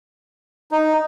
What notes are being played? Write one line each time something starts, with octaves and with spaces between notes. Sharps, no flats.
D#4